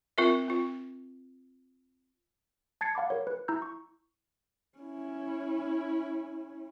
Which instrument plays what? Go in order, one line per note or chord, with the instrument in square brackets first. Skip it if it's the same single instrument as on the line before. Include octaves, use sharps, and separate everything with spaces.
[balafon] C4 F4 A#4 E5
C4 F4
[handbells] A5 G#6 A6 C7 C#7
F5 F#5 B5 D6
A#4 C#5
B4
E4 A#5 E6 G6
C#6
[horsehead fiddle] C#4 E4